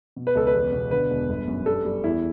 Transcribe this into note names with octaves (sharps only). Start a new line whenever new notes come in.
B2
B4
C#2 A4
B4
E2
B2
D3 B4
E1
G1
F#2
G3 A4
G3
E2 E4